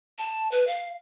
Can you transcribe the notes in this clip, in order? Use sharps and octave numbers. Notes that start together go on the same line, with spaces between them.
A5
B4
F5